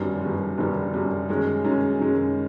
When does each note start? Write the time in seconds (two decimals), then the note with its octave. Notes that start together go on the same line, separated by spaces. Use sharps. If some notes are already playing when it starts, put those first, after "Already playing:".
Already playing: G1 F#2 D#3 G3
0.22 G1 F#2 D#3 G3
0.58 G1 F#2 D#3 G3
0.93 G1 F#2 D#3 G3
1.29 F#2 D#3 G#3 C#4
1.64 F#2 D#3 G#3 C#4
2.00 F#2 D#3 G#3 C#4